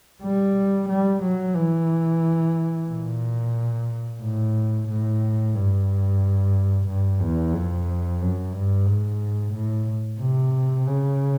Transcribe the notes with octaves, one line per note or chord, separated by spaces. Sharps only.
G3
G3
F#3
E3
A#2
A2
A2
G2
G2
E2
F2
F#2
G2
G#2
A2
C3
C#3